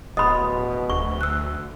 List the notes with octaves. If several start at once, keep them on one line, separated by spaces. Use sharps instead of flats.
D1 B2 D#5 B5 C6 D#6
D2 C#6
E6 F#6